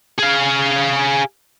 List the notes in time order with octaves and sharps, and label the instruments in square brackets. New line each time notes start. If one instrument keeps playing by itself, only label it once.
[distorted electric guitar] G#4 F5